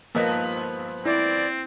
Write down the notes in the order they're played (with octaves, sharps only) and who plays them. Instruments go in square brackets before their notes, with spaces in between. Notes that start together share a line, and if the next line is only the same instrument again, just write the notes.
[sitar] G2 F3 B3 [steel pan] A#3 D#5
[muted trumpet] C4 [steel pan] E4 [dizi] D5